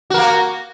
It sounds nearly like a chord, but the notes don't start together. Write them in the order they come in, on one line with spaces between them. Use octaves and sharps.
F#4 A#4 A#3